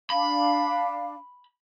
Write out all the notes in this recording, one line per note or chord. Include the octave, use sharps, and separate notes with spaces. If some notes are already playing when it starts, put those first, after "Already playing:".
D4 F5 B5